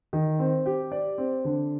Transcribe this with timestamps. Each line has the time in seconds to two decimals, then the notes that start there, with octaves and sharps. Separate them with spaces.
0.13 D#3
0.39 C4
0.66 G4
0.92 D5
1.18 C4
1.44 D3